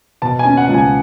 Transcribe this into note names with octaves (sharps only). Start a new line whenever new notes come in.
B2 A5
G#5
C#4
F#5
C#2
G#5